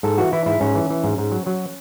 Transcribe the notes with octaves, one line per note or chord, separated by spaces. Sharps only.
G#2 A4
E3 F#4
E3 E4
G#2 E4
G#2 C#4
E3
E3
G#2
G#2
F#3
F#3